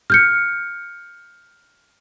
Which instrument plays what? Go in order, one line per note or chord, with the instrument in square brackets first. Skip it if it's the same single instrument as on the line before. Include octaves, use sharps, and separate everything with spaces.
[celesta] F6 G6 C#7